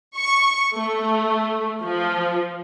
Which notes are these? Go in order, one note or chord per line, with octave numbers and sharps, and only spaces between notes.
C#6
A3
F3